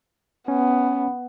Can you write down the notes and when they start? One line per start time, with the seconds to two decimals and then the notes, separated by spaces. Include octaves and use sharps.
0.48 B3 C#4